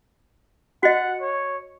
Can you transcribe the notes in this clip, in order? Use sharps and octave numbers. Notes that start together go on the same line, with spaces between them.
F#4 D#5 F#5
C#5